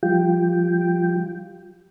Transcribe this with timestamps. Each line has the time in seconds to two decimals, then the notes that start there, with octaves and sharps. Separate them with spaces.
0.03 F3 G3 F4 G5